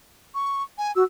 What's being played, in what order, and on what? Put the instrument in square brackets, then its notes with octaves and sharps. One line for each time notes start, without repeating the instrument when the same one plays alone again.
[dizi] C#6
G#5
[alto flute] F#4 [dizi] E6